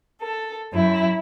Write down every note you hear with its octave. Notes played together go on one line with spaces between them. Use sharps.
A4
F#2 E4